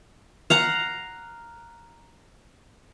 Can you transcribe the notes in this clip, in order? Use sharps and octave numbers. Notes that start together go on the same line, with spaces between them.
F5 F#5 A#5